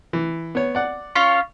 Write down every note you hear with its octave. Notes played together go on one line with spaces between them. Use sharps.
E3
B3 C#5
D5 F#5
C#4 F4 C#5